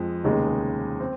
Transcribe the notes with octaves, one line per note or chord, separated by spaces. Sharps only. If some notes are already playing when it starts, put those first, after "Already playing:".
Already playing: F2 G#3
F1 D#2 C#3 G#3 D#4
C4